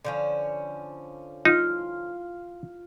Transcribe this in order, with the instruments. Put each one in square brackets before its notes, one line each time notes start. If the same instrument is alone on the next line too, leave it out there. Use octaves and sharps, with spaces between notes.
[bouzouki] D3 F3 C#4
[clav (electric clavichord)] D#4 [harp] F4